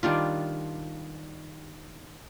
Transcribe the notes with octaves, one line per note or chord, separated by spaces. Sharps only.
D#3 G3 D4 F4